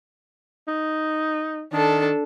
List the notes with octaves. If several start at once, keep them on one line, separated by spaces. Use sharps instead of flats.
D#4
D#3 D4 A4